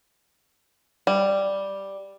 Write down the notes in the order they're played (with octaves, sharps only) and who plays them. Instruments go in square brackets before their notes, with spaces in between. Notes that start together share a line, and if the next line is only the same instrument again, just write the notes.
[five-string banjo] G3